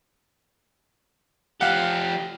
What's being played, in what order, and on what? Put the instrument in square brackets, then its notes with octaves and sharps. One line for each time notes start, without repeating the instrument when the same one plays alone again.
[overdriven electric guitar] F3 G4 [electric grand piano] F5 F#5